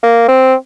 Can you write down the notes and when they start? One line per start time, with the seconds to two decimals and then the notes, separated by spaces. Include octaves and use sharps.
0.03 A#3
0.28 C4